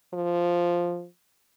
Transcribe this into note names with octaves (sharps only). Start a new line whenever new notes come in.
F3